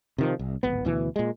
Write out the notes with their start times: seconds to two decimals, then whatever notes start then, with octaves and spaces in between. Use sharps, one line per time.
0.18 C3 D#3 F3
0.39 C2
0.63 D1 G#1 B3
0.85 D2 B2 E3
1.16 A#2 G#3